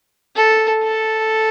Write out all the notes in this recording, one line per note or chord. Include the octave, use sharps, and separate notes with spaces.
A4
A4